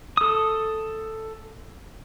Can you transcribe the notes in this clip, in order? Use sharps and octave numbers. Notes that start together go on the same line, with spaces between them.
A4 D#6